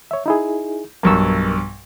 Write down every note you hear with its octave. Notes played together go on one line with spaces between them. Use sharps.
C#5 E5
D#4 E4 G#4
B1 G2 A#4 C#6 E6